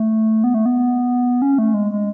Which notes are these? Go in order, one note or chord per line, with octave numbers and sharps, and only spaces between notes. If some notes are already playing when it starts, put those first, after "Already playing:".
Already playing: A3
B3
A3
B3
C#4
A3
G#3
G#3